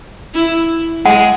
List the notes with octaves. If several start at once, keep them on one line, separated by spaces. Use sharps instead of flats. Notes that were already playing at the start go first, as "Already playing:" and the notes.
E4
G#3 F#5